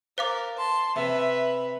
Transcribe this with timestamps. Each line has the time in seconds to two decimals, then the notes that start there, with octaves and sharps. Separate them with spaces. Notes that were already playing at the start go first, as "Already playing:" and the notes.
0.18 A#4 C5 F5 D6 A6
0.57 A5 C6
0.96 C3 B4 E5